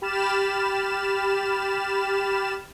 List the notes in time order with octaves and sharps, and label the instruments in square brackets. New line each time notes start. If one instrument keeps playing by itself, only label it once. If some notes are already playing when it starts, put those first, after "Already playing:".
[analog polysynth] G4 B5 F6 A6 E7